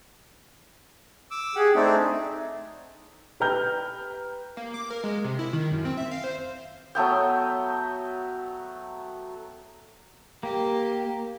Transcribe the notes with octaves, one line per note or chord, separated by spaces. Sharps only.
D6 E6
G4 G#4 F#5
A3 C4 D4 D#4
G4 B4 G5 A#5 F6 G6
A#3
D6
A#4
G#3
C3
E4
D#3
F#2
C4
E5
F5
C5
F#3 A3 B3 G5
A#3 G4